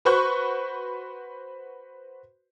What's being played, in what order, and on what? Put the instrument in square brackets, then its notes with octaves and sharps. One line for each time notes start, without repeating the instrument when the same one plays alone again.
[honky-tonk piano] F#4 B4 C5 B5 C#6 F#6